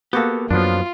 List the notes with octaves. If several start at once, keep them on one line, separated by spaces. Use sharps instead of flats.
A#3 B3 F#4 G4 A4
F#2 F3 F#3 B3 D4 F4